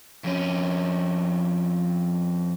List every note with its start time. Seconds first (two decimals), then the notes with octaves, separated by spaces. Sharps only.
0.24 F2 C#4